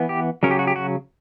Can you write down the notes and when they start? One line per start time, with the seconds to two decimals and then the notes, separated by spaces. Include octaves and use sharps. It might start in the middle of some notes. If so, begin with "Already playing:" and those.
Already playing: E3 B3
0.09 G4
0.43 C#3 F#3 C#4 A#4
0.51 G4
0.59 F#4
0.67 G4
0.76 F#4